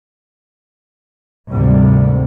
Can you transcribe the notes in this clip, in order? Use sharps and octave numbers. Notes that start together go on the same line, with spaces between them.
G#1 D2 C3 G3